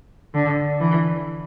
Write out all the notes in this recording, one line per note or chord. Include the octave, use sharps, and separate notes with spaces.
D3
E3